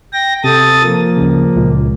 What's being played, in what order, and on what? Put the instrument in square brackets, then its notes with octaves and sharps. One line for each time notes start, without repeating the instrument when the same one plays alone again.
[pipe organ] G5 A#6
[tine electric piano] C3 [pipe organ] A4 D#6 A6
[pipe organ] F3 A#3
[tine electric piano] D2 C#3
C#2 A#2